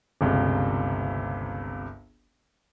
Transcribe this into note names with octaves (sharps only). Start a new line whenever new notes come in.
G1 C#2 C3